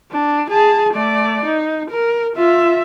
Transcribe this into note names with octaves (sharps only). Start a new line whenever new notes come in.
D4
G#4 A5
A3 D5
D#4
A#4
F4 E5